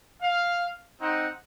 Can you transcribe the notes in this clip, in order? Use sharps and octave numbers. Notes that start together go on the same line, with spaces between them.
F5
C4 D#4 F#5